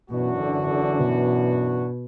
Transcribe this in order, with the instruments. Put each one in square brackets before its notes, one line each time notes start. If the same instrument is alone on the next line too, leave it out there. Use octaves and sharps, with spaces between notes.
[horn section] F#2 E3 D4 F#4 [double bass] B2
[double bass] D3
D3
B2